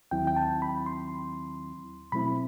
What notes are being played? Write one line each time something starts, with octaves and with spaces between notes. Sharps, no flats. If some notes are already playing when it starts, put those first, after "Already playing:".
D#2 D#3 F#3 C4 E4 G5
G5
A5
B5
C6
B2 F#3 A3 C4 E4 B5